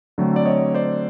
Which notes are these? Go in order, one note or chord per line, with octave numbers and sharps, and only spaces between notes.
D3 F#3 A3 C4
D5
C#5 D#5
C5 D5